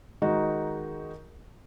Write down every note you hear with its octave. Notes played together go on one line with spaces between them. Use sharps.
D#3 G#3 D#4 F#4